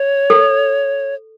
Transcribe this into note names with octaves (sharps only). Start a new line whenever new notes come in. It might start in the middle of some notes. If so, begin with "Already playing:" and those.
Already playing: C#5
A4